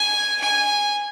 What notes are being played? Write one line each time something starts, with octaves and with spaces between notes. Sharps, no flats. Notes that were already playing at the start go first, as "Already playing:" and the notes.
Already playing: G#5
G#5